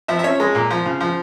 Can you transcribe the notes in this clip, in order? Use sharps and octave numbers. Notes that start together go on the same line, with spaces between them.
F3 E5
E5
C#4 C#5
G#3
A#2
F3
C#3
F3